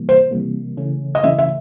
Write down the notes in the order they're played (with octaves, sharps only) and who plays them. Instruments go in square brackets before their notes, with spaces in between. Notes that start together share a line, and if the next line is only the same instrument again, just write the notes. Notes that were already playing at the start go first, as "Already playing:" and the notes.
Already playing: [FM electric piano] C3 E3 G3 A#3
[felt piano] C5
[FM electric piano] C3 E3 G3 A#3
C#3 E3 A3 C#4
[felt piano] D#5
[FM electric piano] C#3 E3 A3 C#4 [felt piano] E5
[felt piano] E5